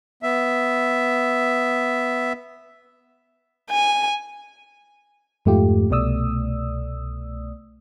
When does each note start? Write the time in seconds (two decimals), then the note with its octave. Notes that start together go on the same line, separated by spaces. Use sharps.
0.23 B3 E5
3.70 G#5
5.45 F2 G#2 A3 F4 G4
5.90 C2 B2 A3 D5 D#6 E6